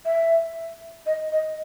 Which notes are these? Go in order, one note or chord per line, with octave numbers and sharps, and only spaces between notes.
E5
D#5
D#5